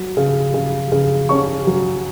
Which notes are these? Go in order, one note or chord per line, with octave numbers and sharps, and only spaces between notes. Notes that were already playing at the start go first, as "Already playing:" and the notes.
Already playing: F#3
C#3
C#3
C#3
C#4 C#6
F#3